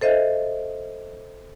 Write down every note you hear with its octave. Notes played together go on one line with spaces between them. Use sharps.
A4 C5 D#5 E5